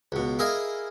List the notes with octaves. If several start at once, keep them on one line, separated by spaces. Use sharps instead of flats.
C#2 B2
E4 G#4 A#4 D#5 F5